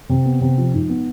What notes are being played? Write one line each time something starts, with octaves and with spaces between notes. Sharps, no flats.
C3
B3
C3
F3
G#2
B3